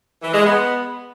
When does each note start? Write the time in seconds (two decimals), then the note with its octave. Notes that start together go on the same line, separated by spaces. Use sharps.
0.22 E3
0.34 G#3
0.45 B3